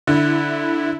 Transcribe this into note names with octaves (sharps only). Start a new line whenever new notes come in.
D3 E4